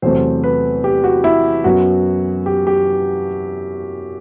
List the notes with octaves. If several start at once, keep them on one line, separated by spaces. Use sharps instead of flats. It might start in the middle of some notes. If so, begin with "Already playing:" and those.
E2 C3 F#3 A3 C4 C5
B4
G4
F#4
E4
F#2 F#3 B3 F#4
G4
G4